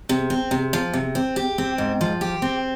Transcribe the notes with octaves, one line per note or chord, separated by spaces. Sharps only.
C3
C4
C3
F3
C3
C4
G4
C4
G#2
F3
G4
C4